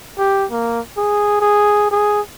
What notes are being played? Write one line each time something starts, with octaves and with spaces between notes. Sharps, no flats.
G4
A#3
G#4
G#4
G#4